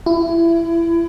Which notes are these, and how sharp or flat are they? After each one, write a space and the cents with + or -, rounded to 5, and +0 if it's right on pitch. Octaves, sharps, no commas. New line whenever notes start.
E4 +25